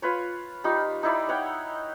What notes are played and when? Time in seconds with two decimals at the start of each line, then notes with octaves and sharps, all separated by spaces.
0.02 F4 B4 C#5
0.64 G3 D#4 F4
1.03 D#4 E4 D5
1.29 C#5 F#5 G5